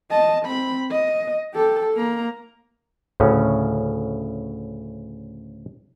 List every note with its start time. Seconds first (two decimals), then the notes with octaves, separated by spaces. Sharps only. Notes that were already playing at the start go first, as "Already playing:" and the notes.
0.10 D#5 A5
0.46 C4 B5
0.91 D#5
1.54 G4 A4
1.94 A#3 A#5
3.20 D2 A2 C#3 C#4